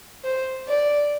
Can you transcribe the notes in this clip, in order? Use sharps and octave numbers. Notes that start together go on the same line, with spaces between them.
C5
D5